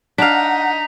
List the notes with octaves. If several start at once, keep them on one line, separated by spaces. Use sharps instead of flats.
D4 D#4 F5 F#5 B6 F7